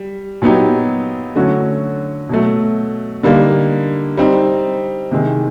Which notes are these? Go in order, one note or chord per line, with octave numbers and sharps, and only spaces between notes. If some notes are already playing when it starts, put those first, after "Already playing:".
Already playing: G3
A#2 F#3 B3 D#4 G4
D3 F#3 A3 C#4 F#4
B2 F#3 A3
D3 G3 A#3 D#4
G3 C4 D#4
C3 D#3 G#3